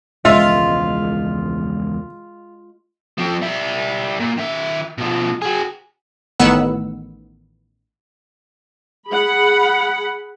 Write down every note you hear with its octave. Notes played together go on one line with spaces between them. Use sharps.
E1 C#2 F3 G#3 F4 E5
F3 C4
G3 E5
A#2
D#3 E5
B2 F3
F#4 G#4
A1 D#3 B3 F#5 E6
G#4 F#5 B5